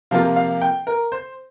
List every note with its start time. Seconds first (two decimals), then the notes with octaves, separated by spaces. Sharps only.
0.11 C3 F3 A#3 F4 F5
0.36 F5
0.62 G5
0.87 A#4
1.12 C5